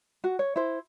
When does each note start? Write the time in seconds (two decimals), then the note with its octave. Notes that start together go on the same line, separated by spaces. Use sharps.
0.24 F#4
0.39 C#5
0.56 E4 C5